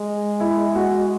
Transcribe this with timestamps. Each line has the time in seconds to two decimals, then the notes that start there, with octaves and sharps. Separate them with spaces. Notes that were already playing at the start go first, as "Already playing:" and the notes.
Already playing: G#3
0.40 E4
0.75 F#4